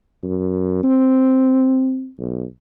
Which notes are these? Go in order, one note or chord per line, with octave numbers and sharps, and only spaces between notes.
F#2
C4
B1